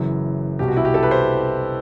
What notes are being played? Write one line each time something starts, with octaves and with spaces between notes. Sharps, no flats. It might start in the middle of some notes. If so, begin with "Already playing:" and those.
Already playing: F#1 F#2 E3
C2 B2 G4
F#4
E4
G4
A4
B4
C5